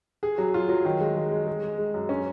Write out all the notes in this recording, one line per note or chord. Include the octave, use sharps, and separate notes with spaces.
G#4
F#3
F4
F#3
D#3
G#3
G#3
G#3
G#3
G#3
G#3
F#2
C#4